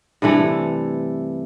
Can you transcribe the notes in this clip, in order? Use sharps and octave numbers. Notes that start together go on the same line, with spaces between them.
G2 C3 E3 A3